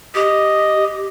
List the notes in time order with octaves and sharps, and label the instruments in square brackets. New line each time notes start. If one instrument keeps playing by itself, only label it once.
[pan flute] G4 [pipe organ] D#5